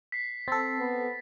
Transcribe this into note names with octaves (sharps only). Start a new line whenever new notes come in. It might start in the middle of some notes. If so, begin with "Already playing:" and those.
B6 C7
C4 A4 A6
B3